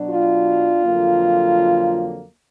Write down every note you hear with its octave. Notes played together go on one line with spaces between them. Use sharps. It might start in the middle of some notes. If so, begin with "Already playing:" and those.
Already playing: B2 F#3 D4
F4
F2 D3 F#3 A#3